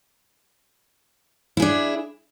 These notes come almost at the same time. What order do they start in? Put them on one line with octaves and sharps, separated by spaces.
E4 G#4 D4